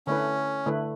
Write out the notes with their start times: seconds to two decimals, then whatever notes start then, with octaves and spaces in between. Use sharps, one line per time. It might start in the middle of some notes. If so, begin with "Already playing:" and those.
0.07 D3 A3 C#4 E4 B4
0.66 D3 A3 E4 B4